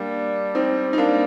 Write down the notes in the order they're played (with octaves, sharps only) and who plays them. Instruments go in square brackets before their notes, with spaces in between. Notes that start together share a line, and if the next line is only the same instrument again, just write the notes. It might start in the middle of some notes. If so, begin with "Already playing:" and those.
Already playing: [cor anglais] G3 [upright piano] A#3 D4
[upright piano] C4 D#4
D#4
A#3 D4